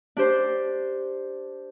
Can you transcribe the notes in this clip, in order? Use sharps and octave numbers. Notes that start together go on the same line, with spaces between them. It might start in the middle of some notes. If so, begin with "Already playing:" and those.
D4 G4 C5